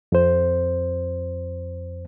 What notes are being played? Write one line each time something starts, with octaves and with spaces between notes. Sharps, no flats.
F2 C5